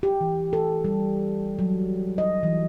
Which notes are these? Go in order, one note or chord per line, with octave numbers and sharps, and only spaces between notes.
G4
E3
A4
G3
F#3
D#5
E3